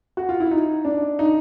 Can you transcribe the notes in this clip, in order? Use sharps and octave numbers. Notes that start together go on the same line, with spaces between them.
F#4
F4
E4
D#4
D4
D#4